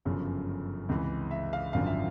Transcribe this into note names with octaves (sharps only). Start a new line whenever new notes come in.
G1 F#2 C#3 F3
C#2 C3 E3
E5
F5
G#1 F#2 D3 F3 F5
E5